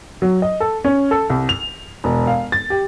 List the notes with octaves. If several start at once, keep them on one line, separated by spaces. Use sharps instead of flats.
F#3
D#5
A4
C#4
A4
C2
F7
E1
F5
A6
G4